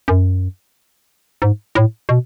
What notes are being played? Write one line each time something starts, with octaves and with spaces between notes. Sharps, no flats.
F#2
G#2
A2
B2